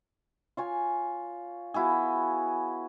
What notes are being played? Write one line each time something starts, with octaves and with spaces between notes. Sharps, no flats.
F4 C#5 G#5
B3 E4 F#4 G#4